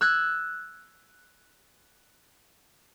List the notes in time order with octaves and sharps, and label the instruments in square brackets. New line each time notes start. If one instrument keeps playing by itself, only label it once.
[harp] E6 F#6 G#6